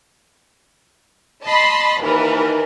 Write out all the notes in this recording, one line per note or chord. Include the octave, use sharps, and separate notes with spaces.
D#5 A5 B5 C6
D#2 E3 A#4 B4